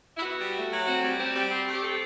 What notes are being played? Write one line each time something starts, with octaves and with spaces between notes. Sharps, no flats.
E4
B3 F#4
G3
A3
F#3
C4 F#4
G3
C4 G4
G3
C4
A3
G4
C4 A4